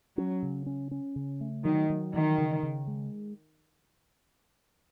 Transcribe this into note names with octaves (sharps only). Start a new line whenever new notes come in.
F#3 C#4
C#3
C#4
C#4
C#3
A3
D#3 F#3
F#3
D#3 E3
C#3
C#3
G#3